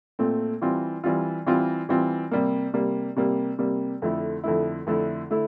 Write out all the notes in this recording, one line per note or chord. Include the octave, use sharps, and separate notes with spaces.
A#2 A3 C4
E3 G3 C4 F4
E3 G3 C4 F4
E3 G3 C4 F4
E3 G3 C4 F4
C3 G3 A#3
C3 G3 A#3
C3 G3 A#3
C3 G3 A#3
F2 D3 A3 E4
F2 D3 A3 E4
F2 D3 A3 E4
D3 A3 E4